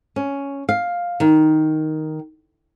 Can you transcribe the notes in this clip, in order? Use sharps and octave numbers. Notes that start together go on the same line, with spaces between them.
C#4
F5
D#3